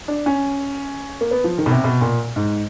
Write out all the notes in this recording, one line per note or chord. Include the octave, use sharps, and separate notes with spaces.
D4
C#4
A#3
B3
F3
D#3
B2
C3
B2
A#2
G#2